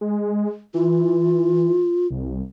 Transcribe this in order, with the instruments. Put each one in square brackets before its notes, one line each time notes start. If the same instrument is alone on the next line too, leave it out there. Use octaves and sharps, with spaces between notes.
[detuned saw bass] G#3
[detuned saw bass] E3 [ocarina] F4
[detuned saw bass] C2